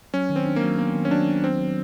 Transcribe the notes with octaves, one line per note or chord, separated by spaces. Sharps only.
F#3 C#4
D#3
C4
D4
A#3
F#3
A#3 B3
D#3
C#4
F#3 D4
F#3
C4 D4
F#3